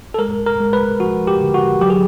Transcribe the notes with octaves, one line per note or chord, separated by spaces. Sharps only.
A4
G#3 A#4
A#4
G#3
B4
F3 F#4
G4
D3
F#4
F#3 G4
G#4